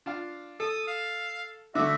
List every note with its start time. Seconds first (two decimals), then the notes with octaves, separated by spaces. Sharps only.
0.06 D4 F4 F5
0.60 A4 D#6
0.88 F5
1.75 D3 A3 F#4 E5 D6